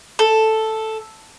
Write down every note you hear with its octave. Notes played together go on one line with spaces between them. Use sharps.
A4